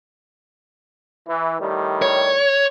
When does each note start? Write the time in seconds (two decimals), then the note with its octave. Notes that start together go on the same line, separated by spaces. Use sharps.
1.28 E3
1.60 A2 D#3 G3
2.02 C#5